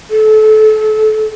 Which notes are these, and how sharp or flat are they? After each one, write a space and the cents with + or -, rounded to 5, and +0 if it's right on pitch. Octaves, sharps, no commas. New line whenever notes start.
A4 -30